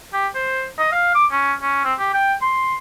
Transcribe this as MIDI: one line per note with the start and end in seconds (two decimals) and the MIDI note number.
0.13 0.27 67
0.35 0.67 72
0.79 0.90 75
0.92 1.15 77
1.15 1.26 86
1.32 1.53 61
1.62 1.82 61
1.84 1.94 60
1.99 2.13 67
2.14 2.34 79
2.42 2.76 84